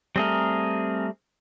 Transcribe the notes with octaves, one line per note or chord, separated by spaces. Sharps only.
G3 A3 C4 G#4 A#4